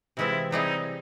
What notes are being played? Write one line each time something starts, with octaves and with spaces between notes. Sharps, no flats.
C3 E3 G#3 C4 E4 F4
G3 C4 D#4 E4 G#4